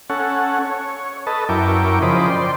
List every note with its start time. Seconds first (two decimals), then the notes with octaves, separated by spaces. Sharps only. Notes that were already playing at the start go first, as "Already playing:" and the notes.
0.10 C#4 A4 F#5
0.62 C#5
1.27 A4 B4 D#5 A5
1.49 F#2 E4 A#4 G5 C#6 D6
2.02 C#3 F3 C5 D#5 B5 D6
2.30 D5 G5 C6